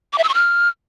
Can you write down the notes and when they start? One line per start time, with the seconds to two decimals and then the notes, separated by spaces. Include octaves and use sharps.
0.13 D6
0.18 E5
0.23 E6
0.29 C#6
0.34 F6